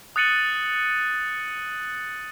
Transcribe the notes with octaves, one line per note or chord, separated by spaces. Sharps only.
D#6 F#6 A6 C#7 D#7 F#7